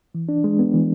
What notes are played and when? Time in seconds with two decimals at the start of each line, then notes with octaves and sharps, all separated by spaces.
0.15 E3
0.29 D4
0.44 G#3
0.59 B3
0.74 E3